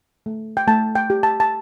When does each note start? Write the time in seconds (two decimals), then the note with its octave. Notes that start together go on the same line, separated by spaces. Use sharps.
0.26 A3
0.57 G5
0.68 A3 A5
0.95 G5
1.10 G4
1.23 A5
1.40 A5